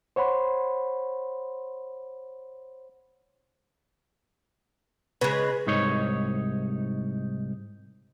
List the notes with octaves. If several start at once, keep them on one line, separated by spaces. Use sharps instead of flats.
C5 C#5 F#5 B5 C6
C#3 G#3 B4
C2 G#2 D#4 C#5